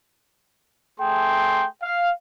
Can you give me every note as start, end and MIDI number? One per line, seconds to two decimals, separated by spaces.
1.00 1.67 57
1.00 1.67 68
1.00 1.67 79
1.00 1.67 84
1.83 2.10 77